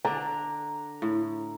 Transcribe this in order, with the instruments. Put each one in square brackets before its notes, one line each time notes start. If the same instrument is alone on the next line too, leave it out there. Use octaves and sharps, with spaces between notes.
[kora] D3 D4 [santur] A#5
[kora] A2